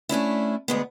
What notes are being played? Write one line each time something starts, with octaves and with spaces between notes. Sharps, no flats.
A3 C#4 D4 E4
D2 G#3 B3